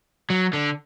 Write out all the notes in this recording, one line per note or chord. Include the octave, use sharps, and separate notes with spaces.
F#3
D3